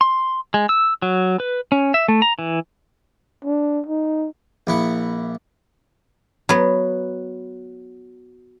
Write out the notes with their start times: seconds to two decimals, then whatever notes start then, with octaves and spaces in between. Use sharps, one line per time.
0.01 C6
0.54 G#3
0.69 E6
1.02 F#3
1.40 B4
1.72 C#4
1.94 E5
2.08 A3
2.22 A#5
2.39 E3
3.45 D4
3.86 D#4
4.67 A#1 E4 F#5
6.49 F#3 B3